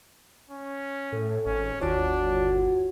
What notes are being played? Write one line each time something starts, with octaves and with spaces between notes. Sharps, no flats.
C#4
A2 A4
G#1 C#4
G1 D#2 D4 F4 F#4 C#5